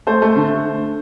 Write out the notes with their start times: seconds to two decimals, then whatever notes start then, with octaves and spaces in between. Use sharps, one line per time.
0.07 A3 C5
0.22 A3
0.36 D3